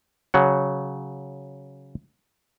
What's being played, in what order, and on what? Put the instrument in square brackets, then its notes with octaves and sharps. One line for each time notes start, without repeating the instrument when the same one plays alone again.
[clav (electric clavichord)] C#3 F#3 F#5